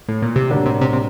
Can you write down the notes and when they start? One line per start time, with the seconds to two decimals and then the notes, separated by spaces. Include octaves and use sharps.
0.08 A2
0.22 A#2
0.36 C3
0.50 A2 D3 G3 A#3 D4 F#4
0.66 C3
0.81 C3
0.93 C3